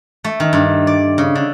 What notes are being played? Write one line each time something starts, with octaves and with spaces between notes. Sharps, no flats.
A3
D#3
G2
D5
C#3
D3